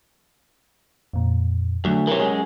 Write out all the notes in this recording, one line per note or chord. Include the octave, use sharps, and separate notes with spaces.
F2 A#2
D2 F#3
C3 E3 A#4 C#5
F#2 G#3